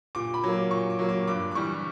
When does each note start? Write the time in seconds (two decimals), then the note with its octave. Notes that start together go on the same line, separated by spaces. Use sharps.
0.15 A#2 D6
0.34 B5
0.44 F#3 A#3
0.52 D6
0.71 A#2 C#6
0.90 D6
0.99 F#3 A#3
1.09 D6
1.27 G2 D6
1.51 D6
1.55 E3 G3 C#6